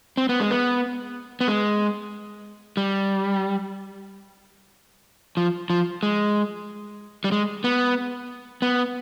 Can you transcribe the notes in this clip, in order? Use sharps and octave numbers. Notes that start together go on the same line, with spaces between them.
C4
B3
G#3
B3
B3
G#3
G3
F3
F3
G#3
G3
G#3
B3
B3